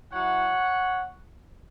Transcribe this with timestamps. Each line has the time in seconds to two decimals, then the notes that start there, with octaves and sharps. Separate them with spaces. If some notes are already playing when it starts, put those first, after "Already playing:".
0.12 F#3 E4 C#5 F#5